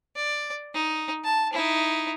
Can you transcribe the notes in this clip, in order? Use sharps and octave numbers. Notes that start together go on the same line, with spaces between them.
D5
D#4
A5
D#4 E4